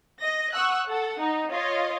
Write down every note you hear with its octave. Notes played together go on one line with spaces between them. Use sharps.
D#5 A#6
F#5 C#6 D#6 E6 F#6
A4 F#5
D#4
F4 C#5 D#5